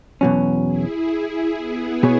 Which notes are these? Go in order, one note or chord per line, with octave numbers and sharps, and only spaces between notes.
E2 B2 F#3 C#4
E4 G#4
E4 G#4
B3 E4
B2 B3 G#4 C#5